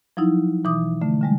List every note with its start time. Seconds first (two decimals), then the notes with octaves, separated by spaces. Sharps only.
0.17 F3 F#3 D#4 E4
0.64 B2 E3 D6 D#6
1.01 D3 A3
1.21 D3 G3 G#3